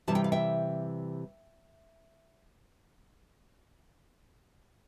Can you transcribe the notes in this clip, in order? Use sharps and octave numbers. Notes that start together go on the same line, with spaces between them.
C3 E3 G3 A5
G5
F5
E5 G5